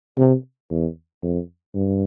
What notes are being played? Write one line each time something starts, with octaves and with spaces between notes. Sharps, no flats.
C3
E2
F2
G2